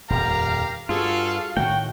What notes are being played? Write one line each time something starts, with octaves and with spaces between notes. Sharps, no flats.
D#1 F2 G4 A#4 F5 A#5
G2 F4 F#4 G#4 A4 F5
A2 D#3 A3 F#4 G5